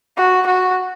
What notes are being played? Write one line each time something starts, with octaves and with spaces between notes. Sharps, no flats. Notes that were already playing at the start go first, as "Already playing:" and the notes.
F#4
F#4